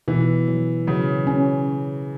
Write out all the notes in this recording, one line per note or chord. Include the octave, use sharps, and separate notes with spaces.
B2 E3
F#3
C#3 F#3
C#4